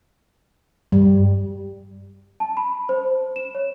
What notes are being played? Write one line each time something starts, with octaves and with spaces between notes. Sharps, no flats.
G2 G3
A5
B5
C5
E7
C#5